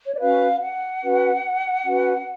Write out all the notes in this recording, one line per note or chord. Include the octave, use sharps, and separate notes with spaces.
C#5
D5
C#4 F#4 B4 F5
F#5
C#4 F#4 B4
C#4 F#4 B4